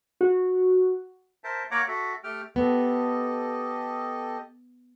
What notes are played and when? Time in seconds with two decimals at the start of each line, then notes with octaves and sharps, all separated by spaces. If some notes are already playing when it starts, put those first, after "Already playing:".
0.21 F#4
1.44 A#4 C5 E5 A5
1.71 A#3 C#5 F#5 A#5 D6
1.88 F#4 A4 E5
2.24 A3 G4 G5 F6
2.56 B3 G4 A4 D#5